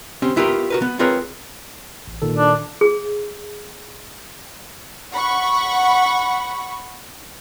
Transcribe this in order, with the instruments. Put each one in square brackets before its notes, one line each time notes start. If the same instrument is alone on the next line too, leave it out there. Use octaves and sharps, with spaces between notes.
[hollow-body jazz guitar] C4 C#4 G4
B3 E4 F4 G4 G#4 A#4
F#4 A#4 B4
B3
C4 F4 G#4 A#4 B4 C#5
[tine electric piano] A1
A#2 D#3 A4
[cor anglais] D4
[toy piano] G#4
[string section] F#5 B5 C#6